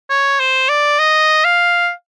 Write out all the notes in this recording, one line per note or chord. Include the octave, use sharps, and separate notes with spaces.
C#5
C5
D5
D#5
F5